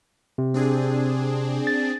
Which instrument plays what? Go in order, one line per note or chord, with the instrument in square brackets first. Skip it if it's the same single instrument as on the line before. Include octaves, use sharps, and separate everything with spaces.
[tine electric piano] C3
[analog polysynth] C4 D4 G#4
[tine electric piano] A6